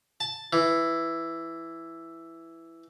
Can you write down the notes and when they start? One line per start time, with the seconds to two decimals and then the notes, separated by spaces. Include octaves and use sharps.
0.20 A5
0.53 E3